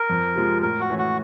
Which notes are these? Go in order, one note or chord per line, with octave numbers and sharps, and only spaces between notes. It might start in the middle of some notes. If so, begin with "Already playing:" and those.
Already playing: A#4
F2
C3 F3 G#3
A2 A#4
F#4
E3 A3 C#4
F#4